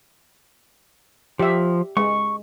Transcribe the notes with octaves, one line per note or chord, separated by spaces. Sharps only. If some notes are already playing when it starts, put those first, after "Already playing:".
F3 G4 E5
G#3 C#6